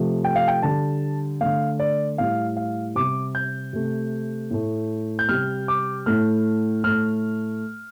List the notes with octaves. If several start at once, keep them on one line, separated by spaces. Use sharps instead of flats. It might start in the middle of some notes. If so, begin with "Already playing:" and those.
Already playing: C3 F3 A3
G5
F5
G5
D3 G3 A5
D3 A3 F5
D5
A2 G3 F5
F5
C3 G3 D6
G6
C3 A3
A2 A3
G6
C3 G3 F6
D6
A2 A3 F6
A2 A3 F6